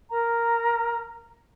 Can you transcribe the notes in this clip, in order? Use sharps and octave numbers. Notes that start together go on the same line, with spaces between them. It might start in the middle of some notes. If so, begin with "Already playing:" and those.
A#4 A#5